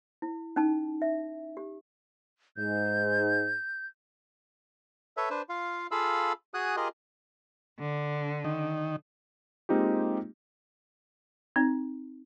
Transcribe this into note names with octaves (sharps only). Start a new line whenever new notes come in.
E4
C#4 D#4 A5
E5
G4
G#2 G6
A4 B4 C#5 E5
D4 B4 C5
F4 F5
F4 G#4 A4 F5 B5 E6
F#4 G#4 G#5 D#6 F#6
F4 G4 G#4 A#4 D#5
D3
D#3
G#3 A#3 C4 D#4 F4 G4
C4 D#4